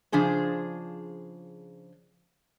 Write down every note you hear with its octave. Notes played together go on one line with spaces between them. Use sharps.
C#3 F3 D4 G#4 C5